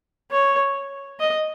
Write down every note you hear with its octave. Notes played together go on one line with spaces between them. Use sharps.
C#5
D#5